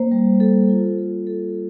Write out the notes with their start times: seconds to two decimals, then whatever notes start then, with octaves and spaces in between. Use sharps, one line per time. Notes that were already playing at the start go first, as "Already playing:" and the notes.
Already playing: A#3 C5
0.12 G3
0.40 A4
0.69 F4
0.98 A4
1.27 A4